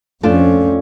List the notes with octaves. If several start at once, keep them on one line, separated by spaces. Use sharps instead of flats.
F2 A3 C#4 D4 F4